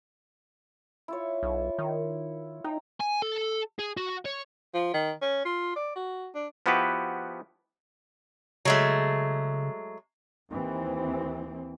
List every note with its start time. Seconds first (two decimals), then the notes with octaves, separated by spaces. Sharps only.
1.08 E4 F4 C#5
1.43 B1
1.78 D#3
2.64 D#4 G5 A#5
3.01 G#5
3.22 A4
3.79 G#4
3.97 F#4
4.26 C#5
4.74 F3
4.94 D#3
5.22 C#4
5.45 F4
5.76 D5
5.95 F#4
6.35 D4
6.66 F3 B3 E4 F#4 G4 B4
8.65 C#3 F#3 G#3 A3
10.51 D#2 E3 C4